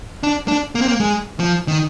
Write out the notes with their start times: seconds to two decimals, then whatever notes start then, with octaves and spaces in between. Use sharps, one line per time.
0.23 D4
0.48 D4
0.75 A#3
0.82 C4
0.88 A#3
1.00 G#3
1.40 F3
1.68 D#3